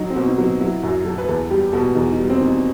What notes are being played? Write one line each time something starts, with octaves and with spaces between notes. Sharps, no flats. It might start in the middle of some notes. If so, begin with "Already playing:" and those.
Already playing: F#3 D#4
C4
B2
D#4
F#3
D#4
F#3 E4
F#2 F#4
F#3 A4
B4
E2 A4
G3 G4
B2 A4
E2 D#4
D#4
G3
C4
D#3
D#4